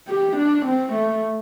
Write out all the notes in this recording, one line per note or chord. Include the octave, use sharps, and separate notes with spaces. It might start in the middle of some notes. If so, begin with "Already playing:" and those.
G4
D4
C4
A3